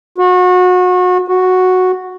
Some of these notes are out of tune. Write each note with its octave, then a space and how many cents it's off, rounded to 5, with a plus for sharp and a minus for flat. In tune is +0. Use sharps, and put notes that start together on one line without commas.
F#4 -30
F#4 -5